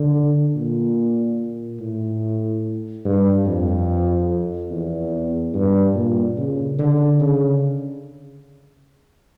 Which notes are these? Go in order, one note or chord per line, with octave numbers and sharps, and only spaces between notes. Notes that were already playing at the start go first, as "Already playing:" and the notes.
Already playing: D3
A#2
A2
G2
F2
E2
G2
A#2
C#3
D3
C#3